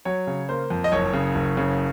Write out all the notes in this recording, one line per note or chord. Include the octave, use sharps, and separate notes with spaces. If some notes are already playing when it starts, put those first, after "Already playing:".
F#3 C#5
C#3
A#3 C5
F2
D#5
F#1 C#5
C#3
F#1
C#3